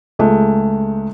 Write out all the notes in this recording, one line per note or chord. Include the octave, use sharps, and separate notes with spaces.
C#2 G#3 A3